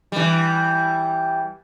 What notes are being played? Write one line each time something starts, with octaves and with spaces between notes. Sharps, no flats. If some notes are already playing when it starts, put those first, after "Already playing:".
E3 G3